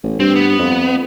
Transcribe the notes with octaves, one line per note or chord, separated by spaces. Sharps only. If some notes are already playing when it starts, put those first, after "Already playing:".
A1
G2 C4
B3
F2